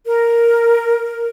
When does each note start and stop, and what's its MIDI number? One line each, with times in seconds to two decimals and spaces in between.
0.05 1.28 70